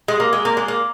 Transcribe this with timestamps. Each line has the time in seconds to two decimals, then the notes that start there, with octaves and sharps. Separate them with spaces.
0.08 G#3
0.20 A#3
0.33 G#3
0.45 A#3
0.57 G#3
0.68 A#3